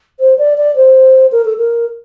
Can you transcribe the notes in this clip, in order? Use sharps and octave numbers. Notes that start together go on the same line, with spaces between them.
C5
D5
D5
C5
A#4
A4
A#4